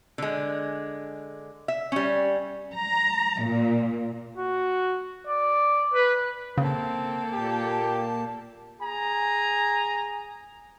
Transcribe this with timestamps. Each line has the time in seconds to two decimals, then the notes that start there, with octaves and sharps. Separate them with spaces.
0.18 D3 G#3
1.68 E5
1.92 G3 C#4
2.74 A#5
3.43 A#2
4.37 F#4
5.27 D5
5.94 B4
6.57 C#3 A#3 C4 A4
7.33 A#2 G4 A5
8.81 G#4 G#5 A#5